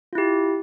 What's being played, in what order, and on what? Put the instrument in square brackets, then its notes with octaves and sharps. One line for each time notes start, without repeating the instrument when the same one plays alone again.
[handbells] F4
E4
G4